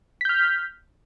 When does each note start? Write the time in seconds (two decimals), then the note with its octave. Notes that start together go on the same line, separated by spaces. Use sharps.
0.21 B6
0.25 G6
0.29 F6